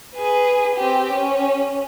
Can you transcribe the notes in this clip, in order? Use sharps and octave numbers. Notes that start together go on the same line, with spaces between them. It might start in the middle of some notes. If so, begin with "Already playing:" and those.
G#4 B4
C4 G4
C#4